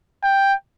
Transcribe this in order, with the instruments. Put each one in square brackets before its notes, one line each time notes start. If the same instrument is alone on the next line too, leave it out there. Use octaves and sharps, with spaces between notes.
[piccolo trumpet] G5